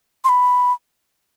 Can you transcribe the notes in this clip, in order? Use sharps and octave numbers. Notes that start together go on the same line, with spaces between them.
C6
B5